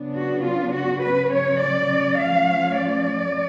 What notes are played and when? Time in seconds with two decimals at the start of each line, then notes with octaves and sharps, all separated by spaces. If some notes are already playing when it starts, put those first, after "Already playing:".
Already playing: C#3 F#3 B3 D4
0.18 F#4
0.46 F4
0.76 F#4
1.04 C#3 F#3 C#4 B4
1.34 C#5
1.63 D5
2.21 F3 A3 C#4 F5
2.80 D5